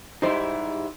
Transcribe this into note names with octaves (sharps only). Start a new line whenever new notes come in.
G#2 G3 D#4 E4 G4 C5